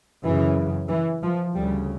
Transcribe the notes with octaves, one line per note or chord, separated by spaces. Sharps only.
F#2 C#3 E3
E3
F3
D2 C#3 G3